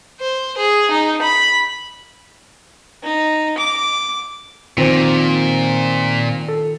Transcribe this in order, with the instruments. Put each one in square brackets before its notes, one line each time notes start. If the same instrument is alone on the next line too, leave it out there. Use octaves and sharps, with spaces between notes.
[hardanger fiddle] C5
G#4
D#4
B5
D#4
D6
[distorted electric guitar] A#2 [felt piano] D#3 F3 [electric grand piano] C4 C5
[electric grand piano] A4